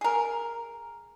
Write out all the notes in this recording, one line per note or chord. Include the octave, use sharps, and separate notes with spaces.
G#4 A#4